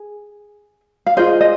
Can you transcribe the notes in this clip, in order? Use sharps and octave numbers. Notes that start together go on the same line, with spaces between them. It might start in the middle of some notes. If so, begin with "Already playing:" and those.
Already playing: G#4
F5
F4 G#4 C5 D#5
D#5